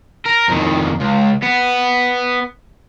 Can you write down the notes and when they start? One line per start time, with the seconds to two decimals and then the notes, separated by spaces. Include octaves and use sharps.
0.26 A#4
0.49 F2 D#3
1.00 C#2
1.43 B3